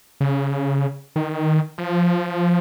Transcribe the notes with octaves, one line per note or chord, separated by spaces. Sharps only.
C#3
D#3
F3